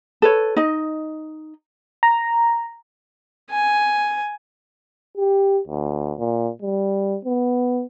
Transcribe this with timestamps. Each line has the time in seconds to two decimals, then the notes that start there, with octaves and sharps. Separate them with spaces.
0.22 A4 B4 C#5
0.56 D#4 D#5
2.03 A#5
3.50 G#5
5.17 G4
5.68 D2
6.19 A#2
6.62 G3
7.25 B3